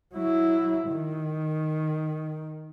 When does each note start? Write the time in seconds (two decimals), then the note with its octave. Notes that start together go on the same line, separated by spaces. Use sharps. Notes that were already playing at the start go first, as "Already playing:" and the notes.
0.14 F#3 E4
0.88 D#3